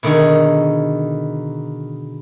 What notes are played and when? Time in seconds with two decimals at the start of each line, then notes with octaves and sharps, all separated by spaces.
0.03 B2 D3 D#3 D#4 G#4